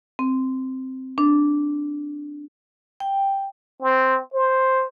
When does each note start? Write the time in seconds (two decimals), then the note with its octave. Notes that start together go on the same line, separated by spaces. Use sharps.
0.19 C4
1.18 D4
3.00 G5
3.82 C4
4.34 C5